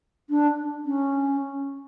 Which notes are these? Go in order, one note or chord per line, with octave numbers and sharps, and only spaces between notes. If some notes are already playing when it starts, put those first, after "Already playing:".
D4
C#4